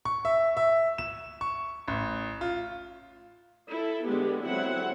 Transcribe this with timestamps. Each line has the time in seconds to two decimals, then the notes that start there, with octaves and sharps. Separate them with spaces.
0.05 C#6
0.25 E5
0.57 E5
0.98 E7
1.41 C#6
1.88 A1
2.41 F4
3.69 E4 A4
4.05 D3 G#3 B3 G4
4.42 D3 F#3 C4 E4 F#5